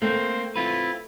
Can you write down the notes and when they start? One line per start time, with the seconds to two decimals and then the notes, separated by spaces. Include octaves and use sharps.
0.02 A3 A#3 C4 C5
0.56 C4 E4 F4 B4